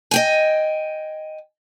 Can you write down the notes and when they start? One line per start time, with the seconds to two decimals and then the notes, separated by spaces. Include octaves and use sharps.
0.11 D#5 G5 G#5